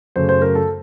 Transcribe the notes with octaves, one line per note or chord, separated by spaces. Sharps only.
F#2 C#3 A3 C5
C5
A#4
A4